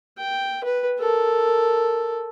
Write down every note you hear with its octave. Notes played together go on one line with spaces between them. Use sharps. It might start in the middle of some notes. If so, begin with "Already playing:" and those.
G5
B4
A4 A#4